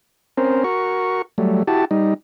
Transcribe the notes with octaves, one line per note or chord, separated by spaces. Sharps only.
C4 C#4 A#4 C5
F#4 A#4 C#6
F#3 G3 A3
E4 F#4 G4 A5
G3 D#4